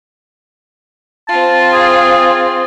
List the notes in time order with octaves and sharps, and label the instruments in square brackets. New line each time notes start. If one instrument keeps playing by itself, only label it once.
[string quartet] C4 F4 [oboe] A5
[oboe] G#4